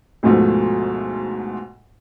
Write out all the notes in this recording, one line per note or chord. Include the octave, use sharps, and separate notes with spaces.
D2 G#2 B2 F3 A3